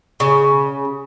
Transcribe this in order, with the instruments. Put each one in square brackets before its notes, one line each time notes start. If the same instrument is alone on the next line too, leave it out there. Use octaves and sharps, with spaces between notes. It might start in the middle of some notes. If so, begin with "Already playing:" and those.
[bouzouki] C#3